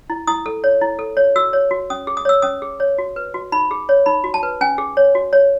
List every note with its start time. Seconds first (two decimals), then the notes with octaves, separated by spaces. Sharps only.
0.10 E4
0.27 E4 D#6
0.46 A4
0.64 C#5
0.81 E4
0.99 A4
1.17 C#5
1.36 F#4 E6
1.53 C#5
1.71 F#4
1.90 C#4 D#6
2.07 G#4
2.17 D#6
2.25 C#5 E6
2.42 C#4 D#6
2.62 G#4
2.80 C#5
2.98 F#4
3.16 B4
3.34 F#4
3.52 D#4 B5
3.71 G#4
3.89 C#5
4.06 D#4 B5
4.24 F#4
4.34 A5
4.43 B4
4.61 C#4 G#5
4.78 G#4
4.97 C#5
5.15 F#4
5.33 C#5